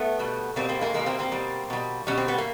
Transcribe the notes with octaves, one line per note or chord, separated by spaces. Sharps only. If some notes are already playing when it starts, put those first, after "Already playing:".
Already playing: A3 B3
B2 G3
B2 G3 A#3 C4
A#3 C4
G#3 A#3
B2 G3 G#3 A#3
A#3 C4
A#3 C4
B2 G3
B2 G3
B2 G3 C#4
C4
B3
A#3